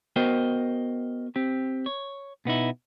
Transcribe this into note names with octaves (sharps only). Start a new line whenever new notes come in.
B3 F#4 A#4 C5 D#5 G5
C4 G4
C#5
B2 B3 D#4 E4